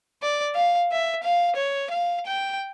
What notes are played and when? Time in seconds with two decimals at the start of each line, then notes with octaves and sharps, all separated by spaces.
0.22 D5
0.55 F5
0.92 E5
1.24 F5
1.56 C#5
1.91 F5
2.26 G5